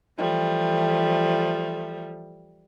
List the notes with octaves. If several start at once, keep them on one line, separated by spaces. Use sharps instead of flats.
E3 F3 G3 A3